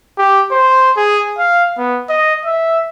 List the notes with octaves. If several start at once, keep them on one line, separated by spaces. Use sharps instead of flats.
G4
C5
G#4
F5
B3
D#5
E5